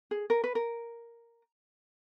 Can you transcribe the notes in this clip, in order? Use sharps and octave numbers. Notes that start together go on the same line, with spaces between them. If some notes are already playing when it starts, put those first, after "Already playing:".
G#4
A#4
B4
A#4